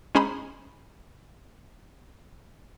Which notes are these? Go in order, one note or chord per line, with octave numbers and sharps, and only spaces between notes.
G#3 C#4 G#4 C5 A#5 B5